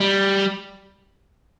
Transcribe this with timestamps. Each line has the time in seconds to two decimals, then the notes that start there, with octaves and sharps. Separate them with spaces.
0.01 G3